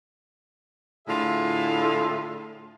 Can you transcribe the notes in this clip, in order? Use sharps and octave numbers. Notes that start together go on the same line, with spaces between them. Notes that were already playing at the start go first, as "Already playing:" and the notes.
A2 D3 F4 G#4 E5